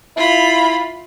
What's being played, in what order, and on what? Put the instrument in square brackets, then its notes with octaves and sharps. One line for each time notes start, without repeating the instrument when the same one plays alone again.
[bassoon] E4 [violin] F4 B5